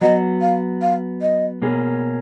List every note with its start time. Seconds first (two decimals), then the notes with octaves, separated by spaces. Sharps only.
0.01 F#3 B3 F#4 D#5
0.41 F5
0.82 F5
1.22 D#5
1.62 B2 A#3 C#4 G#4